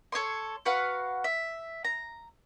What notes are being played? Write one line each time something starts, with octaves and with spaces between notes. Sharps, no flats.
A4 C#5 D#5 C6
F#4 B4 F5 F#5
E5
A#5